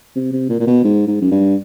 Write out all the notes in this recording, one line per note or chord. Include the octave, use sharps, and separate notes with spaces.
C3
C3
A#2
A#2
B2
G#2
G#2
F#2
G2